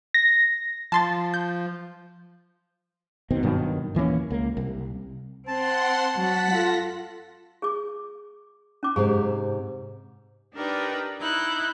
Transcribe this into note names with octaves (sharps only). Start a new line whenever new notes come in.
A#6
F3 A5 C6 A6
G6
F#1 B2 D#3 C4
G2 B2 D#3 F#3
D#1 E3 A#3 C#4
C#2 A#3
C2
C4 F#5 A5 C6
F#3 F#5 B6
F4 A4 A#6
G#4 D6
C#4 D6
G#2 C3 C4 G#4
D4 D#4 G4 A#4 B4 D5
D#4 E4 F#6 G6